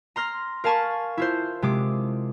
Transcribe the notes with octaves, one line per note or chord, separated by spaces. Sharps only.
A#5 C6 F6 A#6
A#4 F5 G#5 A5 B5 C#6
E4 F4 C5
C3 G#3 D6